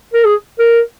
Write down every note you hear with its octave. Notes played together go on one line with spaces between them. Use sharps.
A#4
G#4
A#4